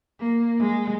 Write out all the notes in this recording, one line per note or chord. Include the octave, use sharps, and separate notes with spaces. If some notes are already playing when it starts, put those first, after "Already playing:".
A#3
G#3